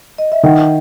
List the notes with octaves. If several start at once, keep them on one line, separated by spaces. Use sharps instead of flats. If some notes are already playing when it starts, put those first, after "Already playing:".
D#5
E5
D#3 F#5